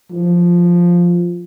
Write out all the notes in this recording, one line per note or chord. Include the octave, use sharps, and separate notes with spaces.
F3